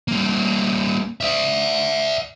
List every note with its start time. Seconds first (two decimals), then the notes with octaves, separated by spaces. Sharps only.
0.08 G3 A#3
1.21 D5 E5